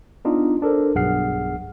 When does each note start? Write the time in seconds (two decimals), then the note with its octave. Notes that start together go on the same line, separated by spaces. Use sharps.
0.25 B3 D4 D#4 F4
0.62 D4 A4 A#4 C5
0.95 B1 G2 G#4 F#5 F6 C7